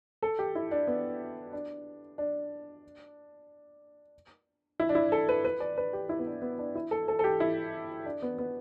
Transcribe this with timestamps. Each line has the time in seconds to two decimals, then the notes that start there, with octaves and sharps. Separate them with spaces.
0.23 A4
0.39 G4
0.55 E4
0.71 D4
0.87 B3
1.53 D4
2.18 D4
4.80 E4
4.89 D4
4.95 E4
5.12 A4
5.29 B4
5.45 B4
5.60 D5
5.78 B4
5.93 G4
6.09 E4
6.19 B3
6.27 D4
6.42 B3
6.59 D4
6.75 E4
6.91 A4
7.08 A4
7.19 A4
7.24 G4
7.40 E4
8.05 D4
8.22 B3
8.38 B3